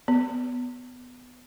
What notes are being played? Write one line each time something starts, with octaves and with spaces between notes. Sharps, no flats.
B3